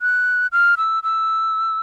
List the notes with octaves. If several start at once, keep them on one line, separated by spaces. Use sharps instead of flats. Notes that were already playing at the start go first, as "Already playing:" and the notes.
F#6
F6
E6
E6